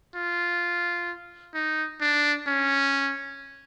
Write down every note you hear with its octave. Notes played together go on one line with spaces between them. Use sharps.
F4
D#4
D4
C#4